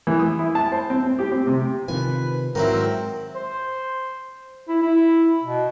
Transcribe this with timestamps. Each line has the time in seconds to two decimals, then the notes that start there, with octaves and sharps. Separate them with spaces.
0.07 E3
0.19 D#6
0.39 E4
0.55 A5
0.72 C5
0.90 C4
1.03 C4
1.19 G4
1.32 C4
1.47 C3
1.88 C3 D#3 F3 B4 G#5
2.55 G#2 D#3 F#3 C4 E4 A#4
3.35 C5
4.68 E4
4.82 E4
5.44 B2